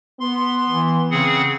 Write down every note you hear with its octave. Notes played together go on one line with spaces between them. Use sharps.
B3 C6
E3
C#3 C4 G#4 F#5